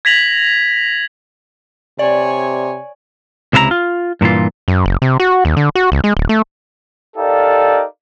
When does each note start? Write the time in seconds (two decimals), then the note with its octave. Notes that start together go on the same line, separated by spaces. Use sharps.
0.05 G#6 A#6 B6 F7 F#7
1.99 C3 C#5 D5 G#5
3.53 C#2 C3 E4 A#4 A#5
3.71 F4
4.21 G2 A#2 E3 F4
4.68 F#2
4.86 F#1
5.02 C3
5.20 F#4
5.45 D#2
5.57 D3
5.75 F#4
5.92 C#2
6.04 G#3
6.17 D1
6.29 A3
7.17 D#4 G4 A4 A#4 D5 F5